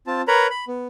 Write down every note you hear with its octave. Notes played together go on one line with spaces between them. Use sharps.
C4 F4 A5
A#4 B4 C#5 A#5 B5
B5
B3